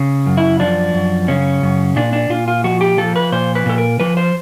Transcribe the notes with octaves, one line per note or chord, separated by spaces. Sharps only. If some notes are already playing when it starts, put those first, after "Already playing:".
Already playing: C#3
F#2
E4
F3 D4
F#2
C#3 C#4
F#2
A#2 D4
D4
A#2 F4
F4
F3 F#4
G4
F3 A4
B4
A#2 C5
B4
A#2 A4
A#4
F3 B4
C5